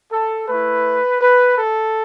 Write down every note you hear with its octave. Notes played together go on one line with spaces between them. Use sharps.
A4
A3 E4 B4
B4
A4